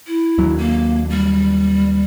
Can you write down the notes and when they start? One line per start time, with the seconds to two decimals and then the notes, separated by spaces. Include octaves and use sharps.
0.07 E4
0.38 D#2 F#3
0.58 A#3
1.10 G3